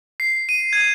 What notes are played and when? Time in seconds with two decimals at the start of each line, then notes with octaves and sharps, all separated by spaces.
0.20 C7
0.49 D#7
0.73 G#6